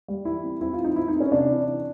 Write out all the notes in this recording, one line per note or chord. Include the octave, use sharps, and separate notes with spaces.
G3
E3 E4
C4
C4 E4
E3 F4
D#4
C4 E4
D#4
C4
C#4
C3 D4
E3
E3